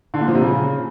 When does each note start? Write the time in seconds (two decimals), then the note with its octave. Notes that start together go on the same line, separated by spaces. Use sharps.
0.14 D3
0.21 A#2
0.28 F3
0.35 C3
0.42 C#3